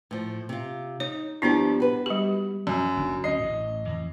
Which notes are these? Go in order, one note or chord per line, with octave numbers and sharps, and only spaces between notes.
A2 F3
C3 F4
D#4 C#5
G2 F3 B3 D4 E4 G4
F#4 B4
G3 G4
F#2
F#1 D4
D2 C#4 D#5 C7
A1 A2
F2 E3